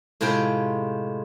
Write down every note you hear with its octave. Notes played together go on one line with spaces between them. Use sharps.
A2 C3 G#3 F4 C5 G5